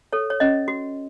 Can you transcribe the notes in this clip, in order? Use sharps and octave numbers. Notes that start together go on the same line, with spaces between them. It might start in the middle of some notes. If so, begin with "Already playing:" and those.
A4 C#5
C#5
C#4 D#5
F#4